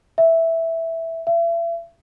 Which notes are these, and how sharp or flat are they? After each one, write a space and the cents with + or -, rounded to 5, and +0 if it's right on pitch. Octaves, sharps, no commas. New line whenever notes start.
E5 -5
E5 +40